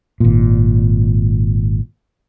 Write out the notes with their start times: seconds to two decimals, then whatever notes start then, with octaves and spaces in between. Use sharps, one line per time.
0.20 G#1 A#2